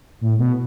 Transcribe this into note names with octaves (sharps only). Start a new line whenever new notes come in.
A2
B2